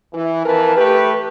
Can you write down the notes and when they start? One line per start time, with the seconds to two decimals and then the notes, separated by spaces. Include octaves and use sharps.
0.14 E3
0.46 F2 E3 A#4 B4 A5
0.77 A3 G4 B4